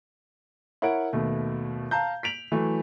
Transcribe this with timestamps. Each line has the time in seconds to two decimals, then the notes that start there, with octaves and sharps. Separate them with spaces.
0.82 E4 A#4 C#5 F#5 D7
1.13 D#2 B2 A3
1.91 F5 A5 A#5 G6
2.23 B6 D7 F7 F#7
2.52 E3 F#3 A3 E4